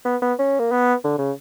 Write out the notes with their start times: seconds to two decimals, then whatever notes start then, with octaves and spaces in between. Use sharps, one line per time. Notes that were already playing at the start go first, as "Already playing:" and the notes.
0.05 B3
0.22 B3
0.39 C#4
0.59 A#3
0.72 B3
1.05 D3
1.18 C#3